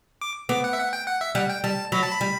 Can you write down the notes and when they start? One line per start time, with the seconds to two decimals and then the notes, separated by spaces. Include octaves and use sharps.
0.21 D6
0.49 B3 D6
0.64 F#5
0.73 E5
0.79 F#5
0.93 G5
1.07 F#5
1.21 E5
1.35 G3 F#5
1.50 G5
1.64 G3 A5
1.92 F#3 B5
2.03 A5
2.12 B5
2.21 G3